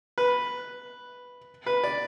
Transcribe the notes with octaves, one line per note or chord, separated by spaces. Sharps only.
B4
B4
D5